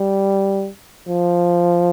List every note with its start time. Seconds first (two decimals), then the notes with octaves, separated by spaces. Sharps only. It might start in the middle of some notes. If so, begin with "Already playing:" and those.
Already playing: G3
1.08 F3